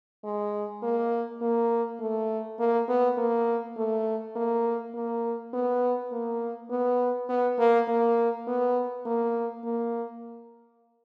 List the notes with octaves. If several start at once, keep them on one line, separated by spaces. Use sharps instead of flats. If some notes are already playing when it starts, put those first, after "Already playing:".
G#3
A#3
A#3
A3
A#3
B3
A#3
A3
A#3
A#3
B3
A#3
B3
B3
A#3
A#3
B3
A#3
A#3